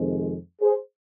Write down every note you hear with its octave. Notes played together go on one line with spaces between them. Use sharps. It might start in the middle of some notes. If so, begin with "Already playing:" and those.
Already playing: F2 C3 D#3 G#3
G#4 C5